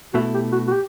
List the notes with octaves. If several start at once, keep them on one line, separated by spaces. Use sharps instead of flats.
B2 A3 E4 F#4
G4
F#4
F#4
G4